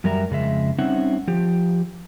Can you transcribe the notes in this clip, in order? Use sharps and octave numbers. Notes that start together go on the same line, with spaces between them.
F#2 F#3 G3 A#4 E5 A#5
F2 C#3 G#3 E5
G3 C4 C#4 D#4 E5 F#5
F3 G4